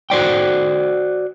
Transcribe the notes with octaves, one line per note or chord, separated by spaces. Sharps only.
F#4 C5 D5 G5